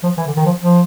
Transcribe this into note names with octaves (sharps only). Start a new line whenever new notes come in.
F3
E3
D3
D#3
F3
F3